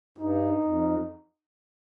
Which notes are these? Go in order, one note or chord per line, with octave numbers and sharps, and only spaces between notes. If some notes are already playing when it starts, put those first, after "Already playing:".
G2 D#4
F2